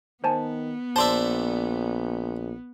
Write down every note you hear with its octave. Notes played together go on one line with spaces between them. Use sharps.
D#3 B3 C5 G#5 A5
A#1 C5 D5 E5 A5 C6